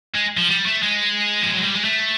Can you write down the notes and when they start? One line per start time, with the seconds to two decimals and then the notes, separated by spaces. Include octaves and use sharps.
0.15 G#3
0.37 F3
0.49 G3
0.66 A3
0.83 G#3
1.42 F3
1.53 F#3
1.63 G3
1.74 G#3
1.85 A3